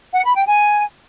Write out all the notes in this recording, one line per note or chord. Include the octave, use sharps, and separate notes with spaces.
F#5
B5
G5
G#5